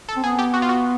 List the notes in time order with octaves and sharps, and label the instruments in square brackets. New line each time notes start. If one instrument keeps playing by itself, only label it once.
[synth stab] A4
[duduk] C4
[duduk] B3 [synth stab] G#4
[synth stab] G4
F#4
F4
F#4